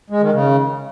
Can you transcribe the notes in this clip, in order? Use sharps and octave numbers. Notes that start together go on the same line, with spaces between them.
G#3
D#3
C#3